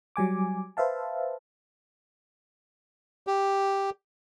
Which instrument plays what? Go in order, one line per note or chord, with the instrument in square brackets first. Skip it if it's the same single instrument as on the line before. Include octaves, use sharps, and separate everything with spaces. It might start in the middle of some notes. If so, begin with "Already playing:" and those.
[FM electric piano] F#3 G3 G#5 D6
B4 C5 E5 F5 A5
[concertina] G4